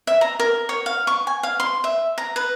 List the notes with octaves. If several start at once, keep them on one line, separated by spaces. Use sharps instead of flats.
E5
A#5
A#4
C#5
F5
C#6
G#5
F5
C6
E5
A#5
B4